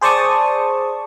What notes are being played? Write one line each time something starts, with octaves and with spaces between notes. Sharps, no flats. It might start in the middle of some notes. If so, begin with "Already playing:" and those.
G#4 C5 D5 A5 C#6 D#6